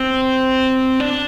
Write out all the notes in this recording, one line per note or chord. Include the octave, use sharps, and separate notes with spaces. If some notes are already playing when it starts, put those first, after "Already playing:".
Already playing: C4
D4